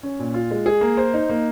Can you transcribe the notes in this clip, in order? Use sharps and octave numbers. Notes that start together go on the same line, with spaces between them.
C#4
A#2
F4
G#3
G#4
A#3
C5
D#4
A#3